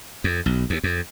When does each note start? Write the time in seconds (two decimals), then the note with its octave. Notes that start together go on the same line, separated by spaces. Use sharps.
0.24 F2
0.46 B1
0.70 D#2
0.84 F2